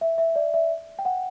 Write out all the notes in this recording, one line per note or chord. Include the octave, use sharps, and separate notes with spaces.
E5
E5
D5
E5
G5
F#5